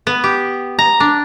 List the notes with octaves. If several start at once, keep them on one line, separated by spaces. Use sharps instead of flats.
B3
G4
A#5
D4